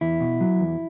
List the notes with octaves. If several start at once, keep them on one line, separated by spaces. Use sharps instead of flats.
E2 E4
B2
F#3
E2